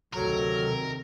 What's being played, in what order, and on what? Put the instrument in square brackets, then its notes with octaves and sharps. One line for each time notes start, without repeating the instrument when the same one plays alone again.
[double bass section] D2 C3 D#3 [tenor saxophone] F#3 [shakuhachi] A4 [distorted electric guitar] A#4